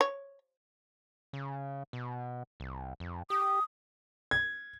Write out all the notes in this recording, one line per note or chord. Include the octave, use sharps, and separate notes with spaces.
C#5
C#3
B2
C2
F2
G4 D#6
G#6